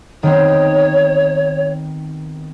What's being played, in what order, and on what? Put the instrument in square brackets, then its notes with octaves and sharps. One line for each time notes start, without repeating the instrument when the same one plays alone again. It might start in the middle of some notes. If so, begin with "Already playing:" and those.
[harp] D#3 B3 C4 [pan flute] C#5